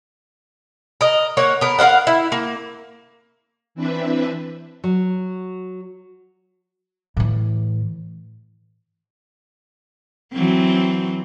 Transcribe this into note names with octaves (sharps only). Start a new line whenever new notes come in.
A#4 D#5
A#3 C#5 F#5
B3 A#4
A#4 C#5 F5 F#5
E4
A#3
E3 C4 D4 B4 E5
F#3
A2 E3
E3 F#3 C4